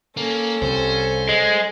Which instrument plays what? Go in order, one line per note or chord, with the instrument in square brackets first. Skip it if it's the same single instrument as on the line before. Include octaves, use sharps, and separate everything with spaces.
[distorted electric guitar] A#3 [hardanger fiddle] C#4 A4
[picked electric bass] C2 [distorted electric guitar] C5
[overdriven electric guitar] G#3